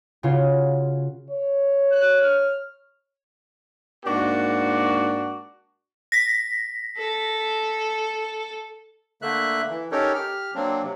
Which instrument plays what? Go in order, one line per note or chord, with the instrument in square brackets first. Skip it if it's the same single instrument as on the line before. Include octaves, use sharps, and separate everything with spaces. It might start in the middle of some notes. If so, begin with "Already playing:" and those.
[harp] C#3 F4 F#4 G#4
[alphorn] C#5
[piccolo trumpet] F#6
F6
[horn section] G#2 A#3 D4 F#4
[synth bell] A#6 B6
[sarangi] A4
[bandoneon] D3 A3 A#3 E5 F#6
E3
C#4 D#4 G4 A4 A#4 C#5
G4 F6
F#3 A#3 C4 D4
C3 F#3